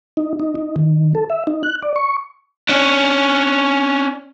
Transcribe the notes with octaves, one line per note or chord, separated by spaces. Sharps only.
D#4
D#4
D#4
D#3
A4
E5
D#4
F#6
D5
C#6
C#4 D4